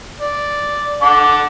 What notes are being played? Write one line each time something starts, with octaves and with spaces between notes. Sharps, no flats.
D5
F#5 A5 D6